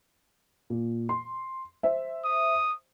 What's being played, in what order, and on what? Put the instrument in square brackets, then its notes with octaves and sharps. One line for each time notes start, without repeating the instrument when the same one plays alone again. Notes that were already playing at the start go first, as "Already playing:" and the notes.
[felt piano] A#2
C6
C5 E5
[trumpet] D#6